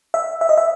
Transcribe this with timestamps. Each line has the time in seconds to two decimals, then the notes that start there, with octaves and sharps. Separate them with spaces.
0.14 E5
0.41 E5
0.49 D#5
0.58 E5